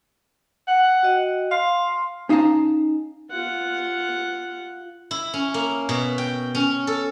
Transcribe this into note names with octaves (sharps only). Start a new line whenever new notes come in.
F#5
F#4 D#5 G5
F5 C6
C#4 D#4 F5 G5 A5 A#5
F4 F#5
E4
C#4
A#3
B2
G5
C#4
A4